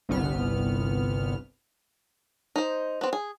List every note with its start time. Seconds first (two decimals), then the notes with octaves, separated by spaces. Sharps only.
0.09 G1 C2 B3 F6
2.56 D#4 C5
3.01 B3 C4
3.13 G#4